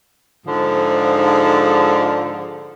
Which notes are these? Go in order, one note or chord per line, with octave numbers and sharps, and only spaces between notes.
G#2 D3 F3